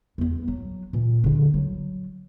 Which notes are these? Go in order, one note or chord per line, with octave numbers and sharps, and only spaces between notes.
E2 B3
F#3
A#2 E3
D3 E4
F#3